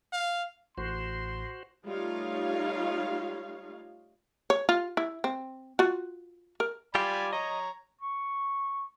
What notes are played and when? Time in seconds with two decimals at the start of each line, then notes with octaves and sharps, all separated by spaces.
0.13 F5
0.78 A1 A2 F#4 C5 C6
1.86 G3 A3 D#4 F4 C#5 F5
4.50 C#5
4.69 F4
4.97 E4
5.24 C4
5.79 F4 F#4
6.60 A#4
6.95 G3 F4 G4 D5 G#5 B5
7.33 C#5 D#5 A#5
8.01 C#6